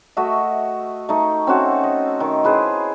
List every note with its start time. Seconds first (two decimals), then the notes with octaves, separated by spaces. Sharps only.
0.17 A3 F#4 D#5 E5
1.09 A3 D#4
1.47 C4 C#4 F#4 A4
1.84 D#5
2.20 D#3
2.44 E4 G#4 B4 C5